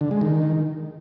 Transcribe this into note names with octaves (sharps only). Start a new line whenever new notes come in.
D3
G#3
D#3